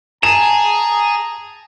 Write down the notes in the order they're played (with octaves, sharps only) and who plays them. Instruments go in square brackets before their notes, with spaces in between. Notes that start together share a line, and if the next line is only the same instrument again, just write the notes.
[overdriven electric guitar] G#4 [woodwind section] A5 A#5 [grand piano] E7